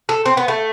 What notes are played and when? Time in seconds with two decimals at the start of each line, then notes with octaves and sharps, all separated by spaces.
0.09 A4
0.26 C4
0.37 B3
0.48 A3